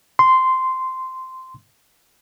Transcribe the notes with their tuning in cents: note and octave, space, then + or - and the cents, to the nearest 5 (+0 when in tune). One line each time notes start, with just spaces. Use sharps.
C6 -10